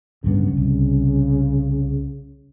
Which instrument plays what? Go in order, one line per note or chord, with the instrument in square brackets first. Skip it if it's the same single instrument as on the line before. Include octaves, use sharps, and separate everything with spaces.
[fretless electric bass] D1 G2 B3 [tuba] C#3
[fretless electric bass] C2